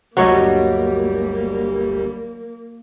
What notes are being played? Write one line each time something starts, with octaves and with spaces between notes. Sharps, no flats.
G1 D2 F#3 G3 A#3 C#5 D#5